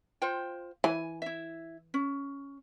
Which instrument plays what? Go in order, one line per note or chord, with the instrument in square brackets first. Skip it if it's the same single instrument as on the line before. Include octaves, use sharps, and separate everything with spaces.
[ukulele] F4 C5 G5
[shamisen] E3 [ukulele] G#5
[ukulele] E4 E5
C#4